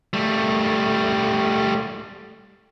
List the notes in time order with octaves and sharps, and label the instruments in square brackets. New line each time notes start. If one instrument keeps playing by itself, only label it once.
[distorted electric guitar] G3 A3